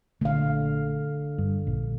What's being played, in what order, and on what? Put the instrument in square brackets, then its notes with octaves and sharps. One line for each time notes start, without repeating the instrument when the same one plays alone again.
[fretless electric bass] A#1 A3 [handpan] D3 F5
[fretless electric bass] G2
A#1